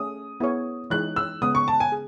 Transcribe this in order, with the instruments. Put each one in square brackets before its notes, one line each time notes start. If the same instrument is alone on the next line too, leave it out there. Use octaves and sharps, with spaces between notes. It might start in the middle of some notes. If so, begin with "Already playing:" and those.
Already playing: [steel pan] A3 C#4 G#4 [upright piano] D#6
[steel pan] B3 E4 G#4 C#5
[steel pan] E3 G#3 D#4 G#4 C#5 [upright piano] F#6
[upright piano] E6
[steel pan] C#3 G#3 B3 [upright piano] D#6
[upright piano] C#6
A5
G#5
[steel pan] G#4